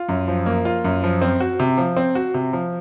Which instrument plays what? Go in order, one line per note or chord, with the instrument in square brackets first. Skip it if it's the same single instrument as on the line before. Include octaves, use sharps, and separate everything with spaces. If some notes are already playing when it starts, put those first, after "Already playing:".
Already playing: [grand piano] F4
F#2
F3
A#3
F4
F#2
F3
C4
F#4
C3
F3
C4
F#4
C3
F3